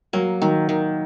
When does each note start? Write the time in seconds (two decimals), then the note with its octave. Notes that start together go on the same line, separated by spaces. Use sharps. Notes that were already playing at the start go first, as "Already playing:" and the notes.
0.13 F#3 A#3
0.42 D#3 F#3
0.69 D#3